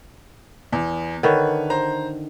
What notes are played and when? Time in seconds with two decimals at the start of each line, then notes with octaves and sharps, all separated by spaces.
0.72 E2
1.23 D3 D#3 B4 C#5
1.70 C5 A#5